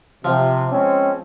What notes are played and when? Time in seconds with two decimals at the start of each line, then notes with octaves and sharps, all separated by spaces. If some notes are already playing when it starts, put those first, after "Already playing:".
0.24 C3 F3
0.71 G#3 C4 C#4